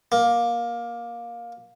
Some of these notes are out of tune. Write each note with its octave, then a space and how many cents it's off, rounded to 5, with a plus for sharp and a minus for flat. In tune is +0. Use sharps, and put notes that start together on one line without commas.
A#3 +15